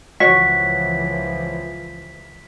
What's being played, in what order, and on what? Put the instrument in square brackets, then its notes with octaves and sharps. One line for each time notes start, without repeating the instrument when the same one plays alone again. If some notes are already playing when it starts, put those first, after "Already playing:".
[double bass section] C#2 E3 F3 [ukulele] F#4 C#5 [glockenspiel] B6